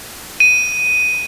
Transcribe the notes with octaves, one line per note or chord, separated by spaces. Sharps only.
D#7